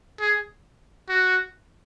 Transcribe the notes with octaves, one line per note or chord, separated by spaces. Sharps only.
G#4
F#4